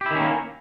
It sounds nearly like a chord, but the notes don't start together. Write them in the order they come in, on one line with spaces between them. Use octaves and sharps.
G4 E4 D#3 C#4 A#3